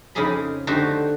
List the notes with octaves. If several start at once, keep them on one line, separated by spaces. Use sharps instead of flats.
F2 C#3 D#4 G4 G#4 B5
D3 A3 D#4 F#4 G4 C5